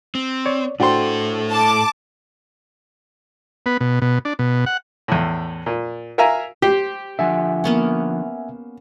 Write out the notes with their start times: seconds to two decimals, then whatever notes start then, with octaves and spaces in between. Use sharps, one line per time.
0.15 C4
0.46 C#5 D5
0.80 A2 D4 F#4 A4 C5 G5 C6
1.51 A5 D6
3.66 B3
3.80 B2
4.02 B2
4.25 D4
4.39 B2
4.66 F#5
5.08 E2 A2
5.66 A#2
6.18 A#4 E5 F5 G#5 A#5
6.62 G4 C5
7.19 D3 F3 E5 F#5 G#5
7.64 A#3 B3 C#4